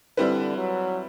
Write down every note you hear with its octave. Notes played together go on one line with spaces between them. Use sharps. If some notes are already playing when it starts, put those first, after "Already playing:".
D3 G3 C4 E4 B4
F#3